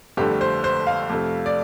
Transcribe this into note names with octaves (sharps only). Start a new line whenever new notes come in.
G1 F2 D3 A3 G4
C5
C5
F5
F2 C3 A3
D5